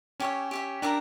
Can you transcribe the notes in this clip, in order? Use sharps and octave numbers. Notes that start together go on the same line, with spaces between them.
C#4 G4 C#5 E5
G4 C#5 E5
D4 G4 A#4 E5 A#5